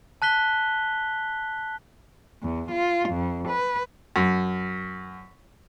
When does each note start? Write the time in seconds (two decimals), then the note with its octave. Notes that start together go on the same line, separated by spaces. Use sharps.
0.22 A5 F#6 B6 G7
2.42 E2
2.72 F4
3.09 F2
3.48 B4
4.16 F#2